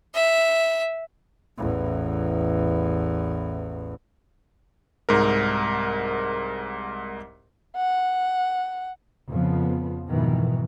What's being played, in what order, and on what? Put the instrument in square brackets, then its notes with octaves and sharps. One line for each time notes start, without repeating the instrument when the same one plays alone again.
[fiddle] E5
[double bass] A1 E2
[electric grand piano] C2 G#2 A#4
[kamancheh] F#5
[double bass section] F2 C#3 F3 B3
F2 G#2 B2 D#3 E3